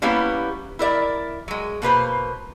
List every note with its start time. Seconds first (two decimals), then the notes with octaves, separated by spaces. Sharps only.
0.02 G3 A#3 B3 C#4 E4 G4
0.79 E4 A#4 D5 E5
1.48 F#3 G#3
1.82 B2 A#3 B4 C5